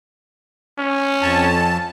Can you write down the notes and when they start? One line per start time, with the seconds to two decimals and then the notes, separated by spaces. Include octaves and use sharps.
0.79 C#4
1.22 F2 A5